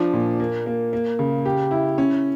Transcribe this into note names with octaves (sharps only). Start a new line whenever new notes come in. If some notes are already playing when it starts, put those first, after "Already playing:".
Already playing: F3 D4
A#2
A#3
A#3
A#3
C#3
G4
E4
C#4